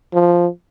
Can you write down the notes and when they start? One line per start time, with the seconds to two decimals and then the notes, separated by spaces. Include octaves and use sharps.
0.13 F3